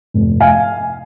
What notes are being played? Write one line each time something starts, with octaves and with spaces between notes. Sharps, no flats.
F1
F5 G#5